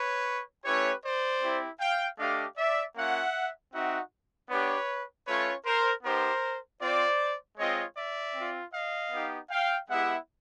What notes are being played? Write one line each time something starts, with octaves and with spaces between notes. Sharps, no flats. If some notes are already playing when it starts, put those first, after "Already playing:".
Already playing: B4 C#5
A3 C#4 E4 G4 B4 C#5
C5 D5
C4 E4 G4
F5 G5
A3 D4 G4 D#5 F5
D5 E5
A#3 C#4 F4 E5 F#5
C4 D#4 F#4 E5 F#5
B3 D4 G4 B4 C#5
A3 C#4 F4 B4 C#5
A#4 C5
B3 D#4 G4 A#4 C5
C4 F4 C5 D5
G#3 C4 F4 C#5 D#5
D5 E5
C4 F4
D#5 F5
B3 D#4 G4
F5 G5
G#3 B3 E4 G4 E5 F#5